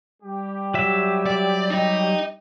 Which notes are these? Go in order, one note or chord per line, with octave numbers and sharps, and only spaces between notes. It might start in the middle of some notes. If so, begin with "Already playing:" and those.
G3 G4
F#3 E5
D5
D#4 D#5